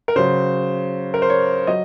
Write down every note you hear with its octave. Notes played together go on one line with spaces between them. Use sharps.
A#4
C#3 F#3 C5
A#4
C5
C#5
F#3 D#5